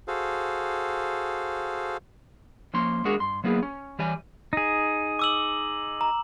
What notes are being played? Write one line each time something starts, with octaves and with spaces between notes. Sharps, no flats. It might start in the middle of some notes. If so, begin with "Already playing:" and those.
F#4 G#4 A4 C5 F5
F3 A#3 C#4 C6
G#3 C#4 D4 F#4 G#4 A#4
G2 C6
F#3 A#3 B3 E4 G#4
C#4
E3 G3 C#5 G#5
D#4 G#4
D6 E6 F#7
A#5